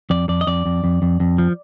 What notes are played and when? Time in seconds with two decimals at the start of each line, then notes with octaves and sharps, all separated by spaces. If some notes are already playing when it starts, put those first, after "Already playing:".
0.10 F2 D5
0.29 F2 D5
0.41 D#5
0.47 F2 D5
0.66 F2
0.84 F2
1.02 F2
1.20 F2
1.38 F3